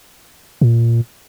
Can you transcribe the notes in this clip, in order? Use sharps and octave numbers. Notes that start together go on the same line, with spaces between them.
A#2